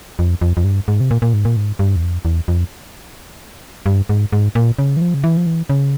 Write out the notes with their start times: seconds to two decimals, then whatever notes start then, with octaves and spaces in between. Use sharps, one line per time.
0.19 F2
0.41 F2
0.57 F2
0.64 G2
0.88 G#2
1.00 C3
1.11 A#2
1.22 A#2
1.34 G#2
1.45 A#2
1.56 G#2
1.79 G2
1.96 E2
2.02 F2
2.25 E2
2.48 F2
3.86 G2
4.09 G#2
4.33 G#2
4.55 A#2
4.79 C#3
4.97 E3
5.01 F3
5.14 C#3
5.24 E3
5.37 F3
5.46 E3
5.70 C#3